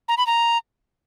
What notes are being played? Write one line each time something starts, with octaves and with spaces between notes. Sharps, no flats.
A#5
B5
A#5